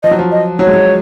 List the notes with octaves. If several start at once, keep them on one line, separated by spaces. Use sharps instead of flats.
F3 D#5
F#3
F3
D#5
F#3 C#5
G#3
F#3